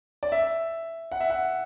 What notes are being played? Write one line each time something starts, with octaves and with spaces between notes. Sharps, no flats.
D5
E5
F#5
E5
F#5